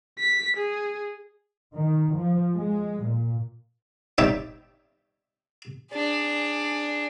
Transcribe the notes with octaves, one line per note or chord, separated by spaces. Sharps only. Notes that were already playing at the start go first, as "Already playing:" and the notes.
B6
G#4
D#3
F3
G#3
A#2
D#4 G4 C#5 D5 E5
D4 G#4